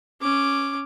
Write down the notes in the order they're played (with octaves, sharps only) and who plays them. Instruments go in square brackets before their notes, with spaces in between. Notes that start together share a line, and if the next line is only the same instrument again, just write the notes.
[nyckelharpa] C#4 D6